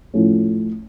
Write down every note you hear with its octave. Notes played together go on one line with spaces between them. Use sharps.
A2 F3 A3 C#4